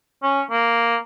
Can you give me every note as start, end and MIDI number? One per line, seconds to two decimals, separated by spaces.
0.23 0.41 61
0.51 0.97 58